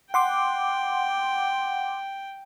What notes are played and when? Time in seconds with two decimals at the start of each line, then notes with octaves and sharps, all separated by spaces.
0.14 F#5 G5 C6 D6